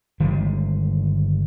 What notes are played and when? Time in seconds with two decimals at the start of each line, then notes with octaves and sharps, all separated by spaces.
0.20 G1 D#3 G3 G#3